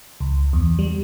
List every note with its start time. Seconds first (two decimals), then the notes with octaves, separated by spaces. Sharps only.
0.21 C#2
0.53 E2
0.79 G3